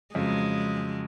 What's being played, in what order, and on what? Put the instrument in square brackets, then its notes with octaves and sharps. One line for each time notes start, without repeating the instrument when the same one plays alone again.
[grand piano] F2 C#3 F#3 [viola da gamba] G#3